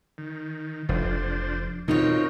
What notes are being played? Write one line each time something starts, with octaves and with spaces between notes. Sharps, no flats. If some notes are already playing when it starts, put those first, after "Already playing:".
D#3
F1 F3 D4 C5
B2 C4 D#4 F4 A#4 C#5